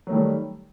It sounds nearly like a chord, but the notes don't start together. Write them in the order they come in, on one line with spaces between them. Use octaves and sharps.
F#3 A3 D#3 G3